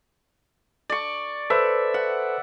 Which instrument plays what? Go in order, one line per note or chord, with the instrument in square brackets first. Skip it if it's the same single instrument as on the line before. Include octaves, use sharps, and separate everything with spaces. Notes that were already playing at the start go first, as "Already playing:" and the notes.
[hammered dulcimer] D5 C#6
[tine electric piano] A4 B4 C5 [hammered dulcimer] E5
[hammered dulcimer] F#5